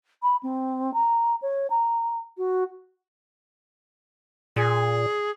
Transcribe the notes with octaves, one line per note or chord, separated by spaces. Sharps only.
B5
C4
A#5
C#5
A#5
F#4
A#2 G#4